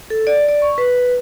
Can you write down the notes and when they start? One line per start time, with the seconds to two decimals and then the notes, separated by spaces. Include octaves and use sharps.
0.10 A4
0.27 D5
0.49 D5
0.62 C#6
0.78 B4